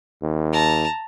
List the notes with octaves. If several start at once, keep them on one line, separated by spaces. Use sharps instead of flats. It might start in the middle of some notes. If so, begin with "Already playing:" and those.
D#2
A5 A#5